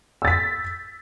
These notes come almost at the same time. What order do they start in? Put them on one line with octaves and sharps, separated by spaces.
E6 A6 B6